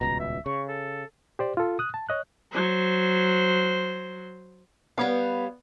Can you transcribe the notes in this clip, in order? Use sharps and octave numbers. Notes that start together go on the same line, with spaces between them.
D#1 C#2 B2 A#5
E5
C#3 C#6
A4
G4 C5 D5
F4 A4
D#6 F#6
A5
C#5 D#5 F#6
F#3 C5
G3 B3 C#5 F5